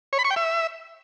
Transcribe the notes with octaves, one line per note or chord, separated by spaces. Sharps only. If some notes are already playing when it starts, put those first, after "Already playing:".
C#5
B5
C#6
G5
E5